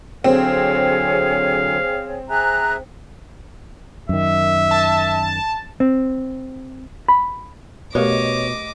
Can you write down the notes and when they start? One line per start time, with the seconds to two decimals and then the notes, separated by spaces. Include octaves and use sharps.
0.24 D3 F#3 C4 G#4 C#5 F5
2.30 G#4 E5 G#5 A#5 F#6
4.09 F#2 D#3 E5
4.71 A5
5.80 C4
7.08 B5
7.95 B2 A3 G4 A#4 C#5 D#5 D6